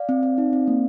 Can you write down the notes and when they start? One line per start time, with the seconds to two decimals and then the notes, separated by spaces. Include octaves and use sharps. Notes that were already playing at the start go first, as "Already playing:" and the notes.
Already playing: D5 F5
0.09 C4
0.23 C4
0.38 D#4
0.53 C4
0.68 A#3